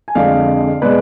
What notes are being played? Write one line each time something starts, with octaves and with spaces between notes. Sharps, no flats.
G#5
F2 D3 G#3 D5 F5
B2 G#3 B4 D5